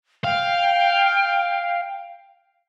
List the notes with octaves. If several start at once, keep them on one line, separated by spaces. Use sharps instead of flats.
F5 G5